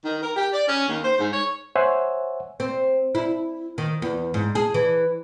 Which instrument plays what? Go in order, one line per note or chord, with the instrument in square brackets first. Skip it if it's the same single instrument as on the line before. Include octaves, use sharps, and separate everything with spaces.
[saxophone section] D#3
A#4
G4
D5
C#4
D#2
C5
G#2
C#5
[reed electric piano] C5 C#5 E5 F#5 G#5
[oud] C4
E4
D#3
E2
G#2
G#4
E3